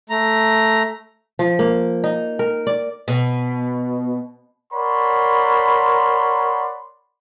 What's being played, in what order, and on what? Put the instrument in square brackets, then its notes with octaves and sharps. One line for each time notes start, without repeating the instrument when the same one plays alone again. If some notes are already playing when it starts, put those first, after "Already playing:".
[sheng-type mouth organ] A3 A#5
[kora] F3
A#3
D#4
A#4
D5
[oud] B2
[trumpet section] A#4 C#5 D5 F#5 B5 C6